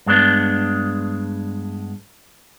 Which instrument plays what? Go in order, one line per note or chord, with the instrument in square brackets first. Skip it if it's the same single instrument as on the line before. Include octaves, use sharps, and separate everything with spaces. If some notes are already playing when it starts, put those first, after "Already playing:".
[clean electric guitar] G2 G#3 B3 D4